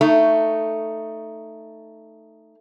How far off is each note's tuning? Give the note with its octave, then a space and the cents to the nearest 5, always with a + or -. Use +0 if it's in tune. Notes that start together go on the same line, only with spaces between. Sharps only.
A3 +10 D#4 +0